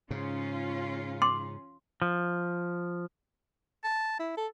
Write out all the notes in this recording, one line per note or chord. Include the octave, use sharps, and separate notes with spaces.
G#2 C#3 C#4 F4
C6 D6
F3
A5
E4
A4